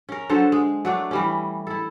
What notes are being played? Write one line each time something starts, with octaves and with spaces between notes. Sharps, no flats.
C#4 A#4
D3 F#3 A4 C5
G#3
F#3 A3 D4
E3 G3 C#4
E4 A4